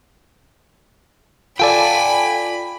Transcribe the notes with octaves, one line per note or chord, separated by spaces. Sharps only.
F4 A4 D5 G5 G#5 B5